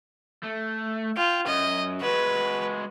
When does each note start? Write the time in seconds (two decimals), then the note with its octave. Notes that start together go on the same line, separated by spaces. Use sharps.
0.44 A3
1.17 F4 G5
1.47 F#2 D#5
2.01 G#3 F#4 B4